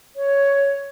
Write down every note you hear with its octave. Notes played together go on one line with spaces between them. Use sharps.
C#5